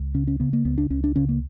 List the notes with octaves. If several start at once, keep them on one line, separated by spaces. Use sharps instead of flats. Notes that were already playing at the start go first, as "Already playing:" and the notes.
Already playing: C#2
C#3 C#4
C#4
C#3 B3
A#3
C#2 B3
D4
C#2 C#4
D4
C#3 C#4
A#3